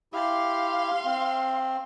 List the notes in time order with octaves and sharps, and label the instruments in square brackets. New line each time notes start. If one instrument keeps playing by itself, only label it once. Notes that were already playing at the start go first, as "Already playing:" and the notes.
[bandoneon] E4 G4 [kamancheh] F5 C6
[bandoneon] C4